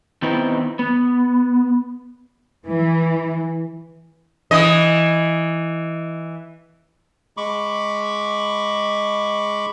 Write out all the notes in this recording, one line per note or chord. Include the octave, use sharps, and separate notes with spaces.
D#3 B3 C4 D#4 E4 B4
B3
E3
E3 D#5
G#3 B5 C#6 D6